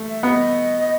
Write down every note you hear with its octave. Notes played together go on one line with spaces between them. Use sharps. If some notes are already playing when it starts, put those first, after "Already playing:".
Already playing: A3
E5
B3 D#5